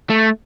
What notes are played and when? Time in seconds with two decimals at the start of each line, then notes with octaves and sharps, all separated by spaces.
0.10 A3